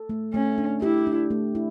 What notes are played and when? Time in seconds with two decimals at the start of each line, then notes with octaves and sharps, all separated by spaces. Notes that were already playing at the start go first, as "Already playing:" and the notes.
Already playing: A4
0.09 A3
0.34 A3 C#4
0.58 D4
0.82 E4 G4
1.07 D4
1.30 A3
1.55 E4